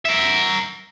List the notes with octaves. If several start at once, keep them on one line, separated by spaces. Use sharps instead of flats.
A#4 E5